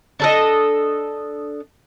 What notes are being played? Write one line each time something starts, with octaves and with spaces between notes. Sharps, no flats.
D4 A4 D#5